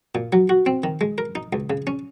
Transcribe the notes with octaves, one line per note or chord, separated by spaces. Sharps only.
A#2
F#3
F#4
C4
D#3
G#3
A#4
D#4
C#2
C#3
C#4